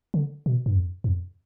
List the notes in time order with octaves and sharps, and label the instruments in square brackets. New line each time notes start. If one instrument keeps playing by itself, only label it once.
[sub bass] D3
B2
G2
F2
G2
F2